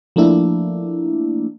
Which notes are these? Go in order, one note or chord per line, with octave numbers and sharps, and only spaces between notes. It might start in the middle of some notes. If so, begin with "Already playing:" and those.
F3 A3 A#3 D4 E4